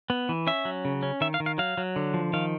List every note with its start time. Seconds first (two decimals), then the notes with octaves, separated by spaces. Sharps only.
0.10 B3
0.29 E3
0.47 C#4 E5
0.65 F#3
0.85 C#3
1.03 C#4
1.21 D#3 E5
1.34 F5
1.40 D#3
1.46 F5
1.58 F#3 F5
1.78 F#3
1.96 D3
2.14 F3
2.33 D#3 F5